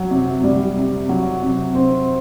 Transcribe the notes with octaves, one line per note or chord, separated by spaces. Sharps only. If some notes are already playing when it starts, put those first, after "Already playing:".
Already playing: F#3
C3
G3
C3
F#3
C3
C4